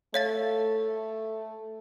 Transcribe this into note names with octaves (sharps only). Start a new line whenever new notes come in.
A3 C#5 F5 A6